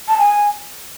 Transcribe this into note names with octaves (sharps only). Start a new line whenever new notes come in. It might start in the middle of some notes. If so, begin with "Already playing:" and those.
A5
G#5